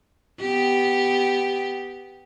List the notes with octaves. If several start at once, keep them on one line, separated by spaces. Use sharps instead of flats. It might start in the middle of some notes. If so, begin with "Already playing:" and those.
B3 G4